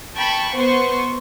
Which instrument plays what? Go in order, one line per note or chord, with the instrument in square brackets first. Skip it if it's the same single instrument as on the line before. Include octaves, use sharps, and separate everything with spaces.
[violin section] G5 A5 B5 C#6
B3 C5 C6 C#6